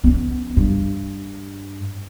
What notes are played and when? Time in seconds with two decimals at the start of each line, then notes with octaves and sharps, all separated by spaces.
0.04 B3 C#4
0.57 G2